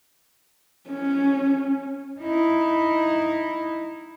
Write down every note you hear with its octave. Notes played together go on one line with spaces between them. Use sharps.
C#4
D#4 E4